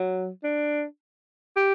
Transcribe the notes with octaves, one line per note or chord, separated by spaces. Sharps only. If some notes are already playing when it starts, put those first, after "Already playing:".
Already playing: F#3
D4
G4